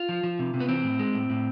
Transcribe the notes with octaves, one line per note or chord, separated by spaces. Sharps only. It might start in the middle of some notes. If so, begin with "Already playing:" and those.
Already playing: F4
F3
F3
C3
C3
B3
E3 C4
A2
G#3
A2
A2